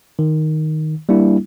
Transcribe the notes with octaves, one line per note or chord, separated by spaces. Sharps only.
D#3
G3 A#3 D4 E4